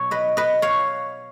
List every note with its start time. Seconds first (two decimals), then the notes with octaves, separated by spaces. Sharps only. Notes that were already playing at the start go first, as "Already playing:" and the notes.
Already playing: B2 F#3 C#5
0.11 B4 D#5
0.37 B4 D#5
0.62 C#5 F5